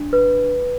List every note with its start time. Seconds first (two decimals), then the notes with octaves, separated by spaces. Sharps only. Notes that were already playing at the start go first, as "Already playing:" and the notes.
Already playing: D4
0.13 B4